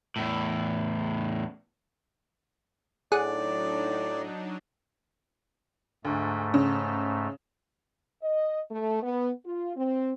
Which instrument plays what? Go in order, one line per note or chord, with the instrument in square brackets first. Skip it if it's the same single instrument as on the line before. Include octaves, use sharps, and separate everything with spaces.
[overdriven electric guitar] E2 A2
[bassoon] A2 [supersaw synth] F#3 D4 D#4 [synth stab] G#4 F#5 [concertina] D5
[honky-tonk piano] D2 [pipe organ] G#2 A3
[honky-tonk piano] C#3
[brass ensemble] D#5
A3
B3
F4
C4